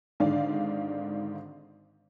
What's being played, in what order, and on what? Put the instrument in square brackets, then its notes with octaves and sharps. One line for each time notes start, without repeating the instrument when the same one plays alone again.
[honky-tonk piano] G#1 G#2 D3 D5 F5